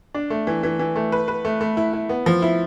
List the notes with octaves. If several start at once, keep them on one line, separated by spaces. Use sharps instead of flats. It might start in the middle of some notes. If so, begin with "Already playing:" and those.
D4
A3
E3
E3
E3
A3
B4
B4
A3
A3
E4
E4
B3
F3
E4